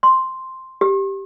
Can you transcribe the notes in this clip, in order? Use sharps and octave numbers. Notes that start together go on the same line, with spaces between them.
C6
G4